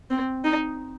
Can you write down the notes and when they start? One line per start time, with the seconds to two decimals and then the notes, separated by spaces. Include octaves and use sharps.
0.10 C4
0.44 D#4